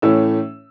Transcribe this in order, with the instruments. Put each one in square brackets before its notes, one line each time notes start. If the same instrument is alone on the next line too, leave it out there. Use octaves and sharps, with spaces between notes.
[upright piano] A2 E3 A3 C#4 E6